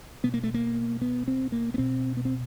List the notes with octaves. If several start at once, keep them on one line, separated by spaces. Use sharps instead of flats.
B2 B3
A#3
A3
A#3
B3
C4
A#3
B3
B2 C4
B3
C4